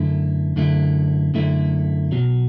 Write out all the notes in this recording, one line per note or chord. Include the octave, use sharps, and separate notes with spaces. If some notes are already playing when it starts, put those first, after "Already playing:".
Already playing: F#2 D3 A3 E4
F#2 D3 A3 E4
F#2 D3 A3 E4
B1 B2 F#3